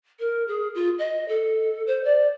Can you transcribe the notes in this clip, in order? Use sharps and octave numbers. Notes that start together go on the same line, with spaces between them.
A#4
G#4
F4
D#5
A4
C5
D5